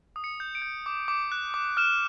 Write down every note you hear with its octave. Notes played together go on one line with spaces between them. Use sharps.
D#6
C#7
G6
D7
G6
D6
D6
F#6
D6
F6 E7